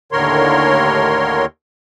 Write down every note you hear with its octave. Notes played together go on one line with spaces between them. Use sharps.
D#2 A2 D3 A#4 C#5 C6